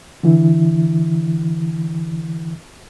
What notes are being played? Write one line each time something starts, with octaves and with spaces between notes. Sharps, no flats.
D3 E3 E4